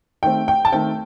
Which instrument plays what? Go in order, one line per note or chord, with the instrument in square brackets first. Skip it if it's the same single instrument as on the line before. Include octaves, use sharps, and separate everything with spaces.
[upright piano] D#3 A3 C4 G5
G5
A5
D#3 A3 C4 G5